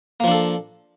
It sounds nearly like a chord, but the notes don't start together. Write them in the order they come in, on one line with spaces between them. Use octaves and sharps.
A#3 F3 D4 A4